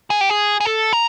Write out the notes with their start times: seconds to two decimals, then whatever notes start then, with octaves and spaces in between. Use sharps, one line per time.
0.10 G#4
0.21 G4
0.30 G#4
0.60 G#4
0.65 A4
0.93 A#4